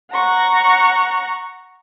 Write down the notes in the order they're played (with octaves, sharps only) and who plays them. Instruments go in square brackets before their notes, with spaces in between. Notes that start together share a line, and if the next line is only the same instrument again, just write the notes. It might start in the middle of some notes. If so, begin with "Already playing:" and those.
[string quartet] F#5 A#5 C#6